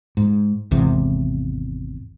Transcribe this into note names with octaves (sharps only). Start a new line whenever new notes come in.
G#2
G#1 E2 C3